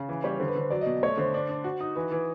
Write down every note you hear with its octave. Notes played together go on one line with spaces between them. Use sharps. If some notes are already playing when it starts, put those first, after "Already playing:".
Already playing: C#3
E3 B4
G3 C#5
D3 C5
B4
D3 C5
F#3 D5
B2 D#5
A3 C#5
D3 C5
D4
D4
F#4
D#4
E3 B4
E3